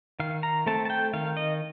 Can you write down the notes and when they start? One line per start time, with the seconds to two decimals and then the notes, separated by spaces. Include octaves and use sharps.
0.20 D#3 F5
0.43 A#5
0.66 A3 C4 A5
0.85 A5
0.90 G5
1.13 D#3 F5
1.37 D#5